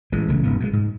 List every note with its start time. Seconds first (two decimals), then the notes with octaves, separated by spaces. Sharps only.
0.12 A1 E3 G#3
0.28 B1 C#3 E3 A3
0.43 F1 G#2 B3
0.60 B2 D3 G#3
0.73 G#2